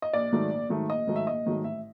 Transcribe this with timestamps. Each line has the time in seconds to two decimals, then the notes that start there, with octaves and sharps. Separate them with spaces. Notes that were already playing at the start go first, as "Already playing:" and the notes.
0.02 D#5
0.13 A#1 D5
0.32 G#2 D#3 F#3 A3
0.51 A#1
0.70 G#2 D#3 F#3 A3
0.90 A#1 D#5
1.07 G#2 D#3 F#3 A3
1.16 E5
1.27 A#1 D#5
1.46 G#2 D#3 F#3 A3
1.64 A1 E5